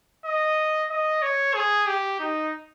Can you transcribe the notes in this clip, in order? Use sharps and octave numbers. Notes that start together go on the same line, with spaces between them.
D#5
D#5
C#5
G#4
G4
D#4